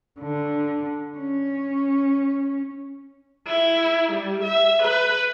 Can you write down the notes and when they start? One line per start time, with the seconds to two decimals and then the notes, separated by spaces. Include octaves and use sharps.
0.20 D3
1.17 C#4
3.47 E4
4.12 G3
4.43 E5
4.82 B4